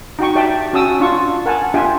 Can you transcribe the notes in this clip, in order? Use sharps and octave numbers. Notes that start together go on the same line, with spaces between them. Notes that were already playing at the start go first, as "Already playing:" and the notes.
D#4 F#4 G5 C#6
G4 D5 E5 G5 A5
C#4 F#4 A5 D#6 E6
D4 F4 C#6
A#4 F#5 G#5 A5
D4 F4 G4 E5 G5 G#5